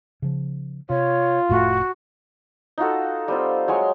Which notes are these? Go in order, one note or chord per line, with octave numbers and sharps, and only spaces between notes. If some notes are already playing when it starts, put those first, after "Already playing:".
C#3 F3
C3 F4 C#5
F1 A2 A3 F#4
D#4 F4 F#4 A4
G3 C4 F4
F#3 G#3 C#5 C6